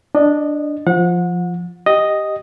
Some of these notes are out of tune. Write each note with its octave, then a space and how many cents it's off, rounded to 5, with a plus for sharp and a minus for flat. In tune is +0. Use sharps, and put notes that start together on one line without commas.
D4 +0 D#5 -20
F3 +0 F#5 -35
G4 +0 D#5 +0